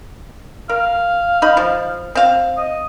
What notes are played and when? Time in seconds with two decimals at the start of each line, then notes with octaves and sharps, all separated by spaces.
0.69 A#4 F5
1.42 D#4 B5
1.57 F3
2.15 C4 F5
2.57 D#5